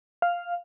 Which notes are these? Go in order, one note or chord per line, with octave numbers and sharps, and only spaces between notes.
F5